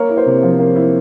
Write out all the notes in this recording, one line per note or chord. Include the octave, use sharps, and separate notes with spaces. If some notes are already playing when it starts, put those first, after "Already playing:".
Already playing: A#3 A#4 C#5
E4
C5
C3
F3
A#3
E4